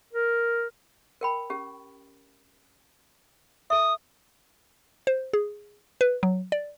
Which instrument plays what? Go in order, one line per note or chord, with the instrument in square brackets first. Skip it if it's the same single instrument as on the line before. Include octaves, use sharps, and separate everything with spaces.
[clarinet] A#4
[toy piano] A#4 G5 B5
C#4 G4
[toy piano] A4 E5 [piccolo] D#6
[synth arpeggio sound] C5
G#4
B4
F#3
D5